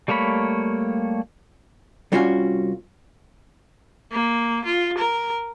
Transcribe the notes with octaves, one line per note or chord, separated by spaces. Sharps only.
G3 A3 A#3 C#5 B5
C2 G3 C#4 F4 F#4 G#5
A#3
F4
A#4